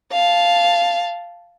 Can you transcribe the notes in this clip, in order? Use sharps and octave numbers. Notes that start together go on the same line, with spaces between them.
F5 A5